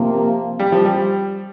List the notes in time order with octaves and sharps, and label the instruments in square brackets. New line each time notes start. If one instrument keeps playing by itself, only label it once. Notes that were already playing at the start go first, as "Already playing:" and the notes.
Already playing: [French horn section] C3 F3 A#3
[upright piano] G3
F3
G3